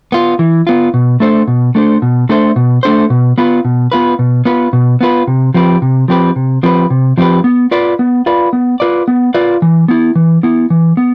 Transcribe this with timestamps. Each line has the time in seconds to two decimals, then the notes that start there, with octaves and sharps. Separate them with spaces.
0.12 B3 F4
0.39 E3
0.67 B3 F4
0.94 B2
1.20 A3 D4 A4 C5
1.48 B2
1.75 A3 D4 A4 C5
2.02 B2
2.29 A3 D4 A4 C5
2.56 B2
2.83 A3 D4 A4 C5
3.10 B2
3.38 B3 F4 B4
3.65 B2
3.92 B3 F4 B4
4.19 B2
4.45 B3 F4 B4
4.73 B2
5.01 B3 F4 B4
5.27 C3
5.54 F3 C4 G4 B4
5.82 C3
6.08 F3 C4 G4 B4
6.36 C3
6.63 F3 C4 G4 B4
6.90 C3
7.18 F3 C4 G4 B4
7.44 B3
7.71 F4 B4 D5
7.99 B3
8.26 F4 B4 D5
8.53 B3
8.80 F4 B4 D5
9.08 B3
9.34 F4 B4 D5
9.62 E3
9.88 B3 E4
10.16 E3
10.43 B3 E4
10.70 E3
10.97 B3